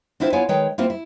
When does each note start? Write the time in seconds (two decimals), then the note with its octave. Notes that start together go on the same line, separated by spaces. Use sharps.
0.20 C4 D4 E4 F4 C5
0.33 B3 E4 F4 C#5 F5 G#5
0.49 D#3 G#3 B4 C#5 G5
0.78 A#3 C4 E4 F4 C5
0.90 E4